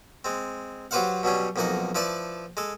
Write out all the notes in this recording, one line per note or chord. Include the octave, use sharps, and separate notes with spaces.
G#3 C4
F#3 G4 B4 C5 F5 F#5
B2 F#3 G3 C#4
B1 F2 A#3 D#4 A#4 F#5
F3 E4 B4 D5 A5
G#3 A4